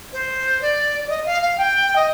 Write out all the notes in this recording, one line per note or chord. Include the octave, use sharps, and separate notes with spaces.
C5
D5
D5
D#5
F5
F5
G5
D#5